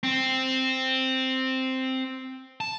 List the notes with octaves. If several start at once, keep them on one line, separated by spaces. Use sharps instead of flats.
C4
A5